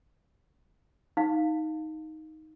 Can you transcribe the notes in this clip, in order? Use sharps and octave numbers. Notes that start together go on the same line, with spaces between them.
D#4 F5